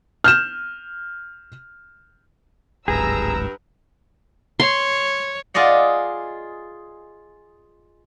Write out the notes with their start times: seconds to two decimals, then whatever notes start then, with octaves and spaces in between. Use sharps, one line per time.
0.24 F6 G6 E7
2.88 D1 G#1 G2 G#4 A#5 E6
4.60 C#5 C6
5.54 F4 G#4 D5 D#5 F#5